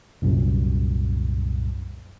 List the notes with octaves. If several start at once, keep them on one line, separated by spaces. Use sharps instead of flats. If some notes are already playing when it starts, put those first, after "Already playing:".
C2 F#2 A#2